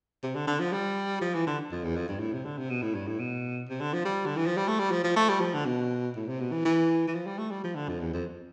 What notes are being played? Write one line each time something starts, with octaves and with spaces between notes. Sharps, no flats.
C3
D3
D3
F3
G3
F3
E3
D3
F2
E2
F2
G2
A2
C3
D3
C3
B2
A2
G2
A2
B2
C3
D3
F3
G3
D3
E3
F3
G3
A3
G3
F3
F3
A3
G3
F3
D3
B2
A2
C3
B2
E3
E3
E3
F3
G3
A3
G3
F3
D3
F2
E2
F2